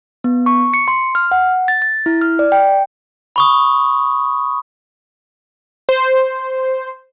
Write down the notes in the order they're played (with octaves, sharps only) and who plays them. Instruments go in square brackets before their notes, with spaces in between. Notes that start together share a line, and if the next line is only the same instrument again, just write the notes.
[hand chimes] B3
C#6
C#7
C6
F6
F#5
A6
A6
E4
F6
D5
G5
[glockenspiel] B5 C#6 D#6
[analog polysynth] C5